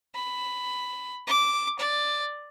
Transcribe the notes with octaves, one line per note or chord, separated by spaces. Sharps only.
B5
D6
D5